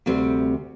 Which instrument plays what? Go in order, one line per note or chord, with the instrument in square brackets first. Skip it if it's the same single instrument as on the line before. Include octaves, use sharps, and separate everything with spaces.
[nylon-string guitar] D2 C3 G3 C4